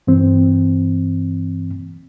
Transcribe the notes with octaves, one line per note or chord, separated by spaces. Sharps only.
G2 E3 C4